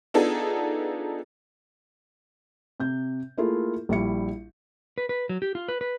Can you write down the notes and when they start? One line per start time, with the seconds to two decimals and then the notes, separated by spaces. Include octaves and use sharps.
0.14 B3 D4 D#4 F4 G#4 A4
2.80 C3 G6
3.38 A3 A#3 E4 F4 G#4
3.89 A#1 G3 E4 C#7
4.98 B4
5.09 B4
5.29 F#3
5.42 G4
5.55 F4
5.68 B4
5.81 B4